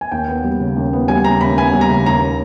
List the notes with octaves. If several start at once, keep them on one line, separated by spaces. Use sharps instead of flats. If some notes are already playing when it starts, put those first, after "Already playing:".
G#5
D#2 G5
B3
G3
C#3
D#2
B3
G3 G#5
C#3 A#5
D#2 B5
B3 G#5
G3
A#5
C#3
D#2 A#5